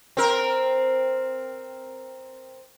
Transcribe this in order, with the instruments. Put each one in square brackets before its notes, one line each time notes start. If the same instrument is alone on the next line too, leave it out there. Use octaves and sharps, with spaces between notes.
[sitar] C4 A#4